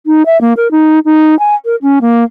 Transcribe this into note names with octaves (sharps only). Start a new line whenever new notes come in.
D#4
E5
A#3
A#4
D#4
D#4
G#5
A#4
C#4
A#3